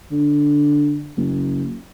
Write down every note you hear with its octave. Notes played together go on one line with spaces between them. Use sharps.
D3
F#1